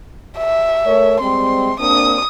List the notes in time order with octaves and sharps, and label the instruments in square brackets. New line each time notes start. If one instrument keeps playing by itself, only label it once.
[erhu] E5
[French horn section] A3 A#4 C#5
[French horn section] G3 G#3 C4 [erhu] C6
[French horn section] A#3 C4 D4 [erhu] D#6